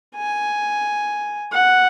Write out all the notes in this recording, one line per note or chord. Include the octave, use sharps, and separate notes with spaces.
G#5
F#5